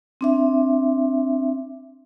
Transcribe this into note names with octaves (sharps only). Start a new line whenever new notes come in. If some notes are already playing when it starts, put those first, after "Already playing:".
C4 D4 E5